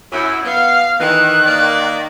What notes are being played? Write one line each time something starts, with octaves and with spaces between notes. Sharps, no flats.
F#2 E4
B3 F5
D#3 E3 F#6
A#3 D5